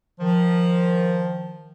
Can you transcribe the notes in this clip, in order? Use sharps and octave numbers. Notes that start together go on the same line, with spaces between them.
D#3 F3